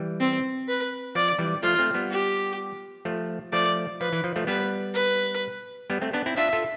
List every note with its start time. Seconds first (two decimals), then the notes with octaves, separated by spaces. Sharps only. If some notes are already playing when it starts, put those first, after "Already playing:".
Already playing: E3 G3
0.20 C4
0.68 B4
1.15 F3 D5
1.38 E3 G3
1.63 F3 A3 F4
1.79 A3 C4
1.94 G3 B3
2.11 G4
3.05 F3 A3
3.53 F3 A3 D5
4.01 F3 B4
4.12 E3
4.24 F3
4.36 F3 A3
4.47 G3 B3 B4
4.95 B4
5.90 G3 B3
6.02 A3 C4
6.13 B3 D4
6.26 C4 E4
6.37 D4 F4 E5
6.53 F4 A4